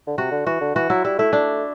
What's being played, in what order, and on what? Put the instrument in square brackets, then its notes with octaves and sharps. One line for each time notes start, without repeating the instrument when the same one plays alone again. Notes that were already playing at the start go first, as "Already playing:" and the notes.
[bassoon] D3
[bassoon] C3 [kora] F#4
[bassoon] D3
[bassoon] E3 [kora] F#4
[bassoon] D3
[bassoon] E3 [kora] F#4
[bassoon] F#3 [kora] E4
[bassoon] G3 [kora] E4
[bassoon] A3 [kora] E4
[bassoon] A3 [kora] D4